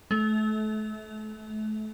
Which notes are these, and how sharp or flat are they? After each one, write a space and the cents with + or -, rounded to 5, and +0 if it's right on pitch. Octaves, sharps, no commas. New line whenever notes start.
A3 -30